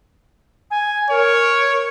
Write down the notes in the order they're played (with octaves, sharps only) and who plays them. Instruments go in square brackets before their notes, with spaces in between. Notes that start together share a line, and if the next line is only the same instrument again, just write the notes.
[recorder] G#5
[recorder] A#4 [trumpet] C#5